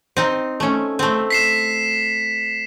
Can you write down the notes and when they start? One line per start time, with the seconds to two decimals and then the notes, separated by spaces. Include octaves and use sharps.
0.17 C4 D#4
0.60 A3 C#4
0.99 A3 C4
1.31 B6 C7 E7